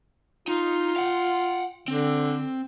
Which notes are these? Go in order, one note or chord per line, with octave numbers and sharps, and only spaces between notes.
D#4 F4
F5 F#5
D3 C4